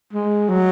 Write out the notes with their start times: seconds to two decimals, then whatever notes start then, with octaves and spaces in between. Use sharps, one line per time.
0.13 G#3
0.49 F#3